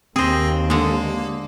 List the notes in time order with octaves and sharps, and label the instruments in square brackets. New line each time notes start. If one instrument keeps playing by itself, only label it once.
[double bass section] D#2 [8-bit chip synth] C4 A#6 [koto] G#4 C5
[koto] D3 G#3 [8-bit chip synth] A#3